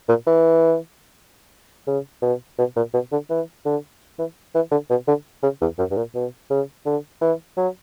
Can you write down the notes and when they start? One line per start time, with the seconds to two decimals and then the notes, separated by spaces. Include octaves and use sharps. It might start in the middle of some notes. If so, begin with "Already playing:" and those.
0.09 A#2
0.27 E3
1.87 C#3
2.22 B2
2.58 B2
2.76 A#2
2.94 B2
3.12 D3
3.30 E3
3.66 D3
4.19 E3
4.55 E3
4.71 D3
4.90 B2
5.08 D3
5.43 C#3
5.61 E2
5.79 F#2
5.91 G2
5.97 A#2
6.15 B2
6.50 C#3
6.86 D3
7.21 E3
7.57 F#3